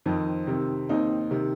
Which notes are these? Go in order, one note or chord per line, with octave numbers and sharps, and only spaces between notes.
F2 D#3 C4 D#4
C3 D#3 C4
D#2 D#3 C4 D#4
C3 D#3